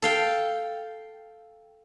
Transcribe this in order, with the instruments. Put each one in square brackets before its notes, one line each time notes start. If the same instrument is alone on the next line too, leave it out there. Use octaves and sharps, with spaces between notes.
[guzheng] A4 F5 G5